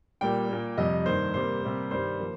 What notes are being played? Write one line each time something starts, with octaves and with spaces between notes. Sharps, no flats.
A#2 G3 A#3 G5
A#2 A#3
F2 C3 G3 D#5
G2 D#3 A#3 C5
C3 G3 A#3 C5
C3 G3 A#3
G2 D#3 G3 C5
F3 A#3